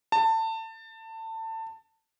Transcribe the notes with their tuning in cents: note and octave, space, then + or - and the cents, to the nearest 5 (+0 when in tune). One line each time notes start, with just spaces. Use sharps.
A5 +25